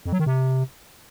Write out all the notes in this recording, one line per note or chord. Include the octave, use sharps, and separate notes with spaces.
F2
F#3
D#3
C3